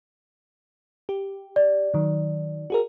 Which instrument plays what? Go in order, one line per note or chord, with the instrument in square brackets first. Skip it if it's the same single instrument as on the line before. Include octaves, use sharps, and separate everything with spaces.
[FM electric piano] G4
[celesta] D5
[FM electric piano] D#3 F#3
F#4 G#4 A#4